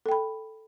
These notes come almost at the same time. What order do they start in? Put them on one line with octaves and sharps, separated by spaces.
A4 G5 B5